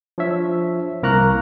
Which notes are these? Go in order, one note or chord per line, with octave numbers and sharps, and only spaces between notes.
F3 D4 C#5 E5
C2 A#3 A#4 A#5 C#6 F#6